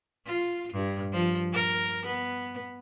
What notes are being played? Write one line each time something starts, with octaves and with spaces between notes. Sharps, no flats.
F4
G2
F3
A#4
B3